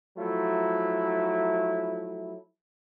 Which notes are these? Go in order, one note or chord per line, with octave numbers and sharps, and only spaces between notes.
F3 F#3 A3 E4